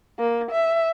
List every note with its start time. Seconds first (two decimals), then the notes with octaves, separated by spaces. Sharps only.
0.19 A#3
0.51 E5